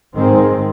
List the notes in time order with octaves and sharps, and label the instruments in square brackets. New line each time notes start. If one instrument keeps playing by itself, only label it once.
[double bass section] G#2 D#3 G#3 C4